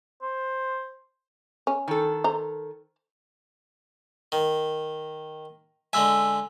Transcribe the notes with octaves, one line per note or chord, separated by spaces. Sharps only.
C5
C#4
D#3 A4
C5 A#5
D#3
D3 G#3 E5 G#5 E6